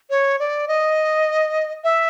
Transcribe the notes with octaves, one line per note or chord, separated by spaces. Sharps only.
C#5
D5
D#5
E5